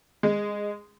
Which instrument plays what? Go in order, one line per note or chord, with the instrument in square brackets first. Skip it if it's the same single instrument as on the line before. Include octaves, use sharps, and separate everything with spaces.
[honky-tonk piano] G#3